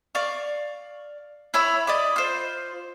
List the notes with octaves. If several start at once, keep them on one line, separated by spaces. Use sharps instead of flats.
D5 F5 C#6
E4 C#5 B5 E6
D5 D#5 B5 D6
F4 C5